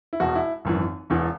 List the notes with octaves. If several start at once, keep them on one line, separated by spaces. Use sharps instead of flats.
E4
E1 E2 B2 F#4
E4
G#1 F#2 E3
E1 E2 E3